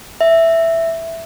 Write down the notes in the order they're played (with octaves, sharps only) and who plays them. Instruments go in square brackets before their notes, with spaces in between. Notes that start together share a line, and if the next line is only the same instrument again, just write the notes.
[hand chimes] E5